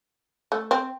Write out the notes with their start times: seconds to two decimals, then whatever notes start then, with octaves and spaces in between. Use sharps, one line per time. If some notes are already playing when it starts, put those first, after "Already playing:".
0.52 A3
0.71 C4